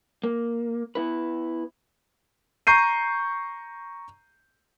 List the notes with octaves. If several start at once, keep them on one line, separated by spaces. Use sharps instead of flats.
A#3
B3 E4 B4
A#5 C#6 G6 C7 D#7